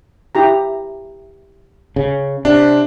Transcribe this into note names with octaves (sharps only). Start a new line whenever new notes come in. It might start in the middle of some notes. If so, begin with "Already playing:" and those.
E4 G4 A#5
C#3
C3 D4